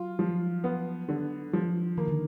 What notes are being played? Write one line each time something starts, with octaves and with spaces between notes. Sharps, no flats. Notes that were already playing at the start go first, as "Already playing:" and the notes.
Already playing: F#3 F4
F3
B3
D3
F3
D#3 A#3
D3